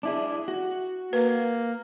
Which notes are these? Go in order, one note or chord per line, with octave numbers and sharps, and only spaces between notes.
D4 E4 G#4
F#4
A#3 B4